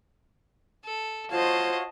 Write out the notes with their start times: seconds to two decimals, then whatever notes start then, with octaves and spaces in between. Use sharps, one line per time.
0.84 A4
1.31 F4 F#4 C5 C#5 D#5 F5 A5